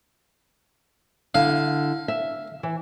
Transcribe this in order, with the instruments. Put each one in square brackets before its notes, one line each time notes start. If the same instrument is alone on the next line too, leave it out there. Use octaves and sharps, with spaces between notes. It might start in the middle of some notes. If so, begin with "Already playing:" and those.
[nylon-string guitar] D3 E4 [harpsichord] F5
[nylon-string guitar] E5
E3